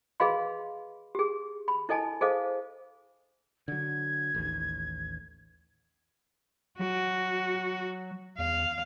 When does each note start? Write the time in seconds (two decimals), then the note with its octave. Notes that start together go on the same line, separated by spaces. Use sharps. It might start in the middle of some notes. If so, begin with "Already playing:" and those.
0.20 G#4 B4 D#5 F5 B5 C6
1.15 G4 G#4
1.68 B5
1.89 E4 A4 D#5 G#5 A5
2.21 G#4 A4 C5 D#5 F5
3.68 D3 F#3 G#6
4.35 A1 D#2
6.79 F#3 F#4
8.38 E2 F5